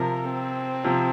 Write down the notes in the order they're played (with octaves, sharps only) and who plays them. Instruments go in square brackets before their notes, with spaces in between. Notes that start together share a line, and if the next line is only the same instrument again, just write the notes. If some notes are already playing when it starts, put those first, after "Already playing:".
Already playing: [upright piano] C3 F3 [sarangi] A#4
[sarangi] C4
[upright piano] C3 F3